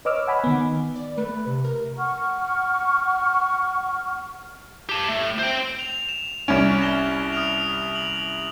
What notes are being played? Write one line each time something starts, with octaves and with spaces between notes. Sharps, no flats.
B4 C#5 D#5 D6 E6 F6
F#5 G#5 B5
D#3 B3
D5
A3 B4
C3
A#4
F#5 C#6 F6
G4 A5
A2 A3
C5 G5
F7
E7
C2 C#4 D7 E7
A#6 E7 G7
D#6 F6 F7
F7 F#7